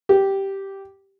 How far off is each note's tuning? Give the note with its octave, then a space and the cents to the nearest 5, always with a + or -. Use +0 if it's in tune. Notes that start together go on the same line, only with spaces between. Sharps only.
G4 -5